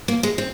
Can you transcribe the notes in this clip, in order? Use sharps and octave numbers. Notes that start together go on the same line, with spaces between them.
A#3
G#3
C4